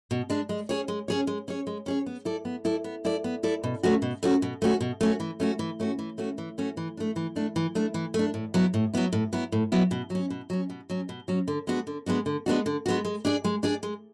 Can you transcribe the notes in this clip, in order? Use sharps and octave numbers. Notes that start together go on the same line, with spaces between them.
B2
G#3 D4
G#3
C#4 G#4 C#5
G#3
C#4 G#4 C#5
G#3
C#4 G#4 C#5
G#3
C#4 G#4 C#5
B3
E4 A4 D5
B3
E4 A4 D5
B3
E4 A4 D5
B3
E4 A4 D5
B2
A3 C#4 F#4
B2
A3 C#4 F#4
B2
A3 C#4 F#4
B2
A3 C#4 F#4
E3
A3 C#4 F#4
E3
A3 C#4 F#4
E3
A3 C#4 F#4
E3
A3 C#4 F#4
E3
A3 D4
E3
A3 D4
E3
A3 D4
E3
A3
D4
A2
F#3 B3 E4
A2
F#3 B3 E4
A2
F#3 B3 E4
A2
F#3 B3 E4
B2
F#3 C#4
B2
F#3 C#4
B2
F#3 C#4
B2
F#3 C#4
D3
G#3 B3 D4 F#4
D3
G#3 B3 D4 F#4
D3
G#3 B3 D4 F#4
D3
G#3 B3 D4 F#4
G#3
D4 G#4 D5
G#3
D4 G#4 D5
G#3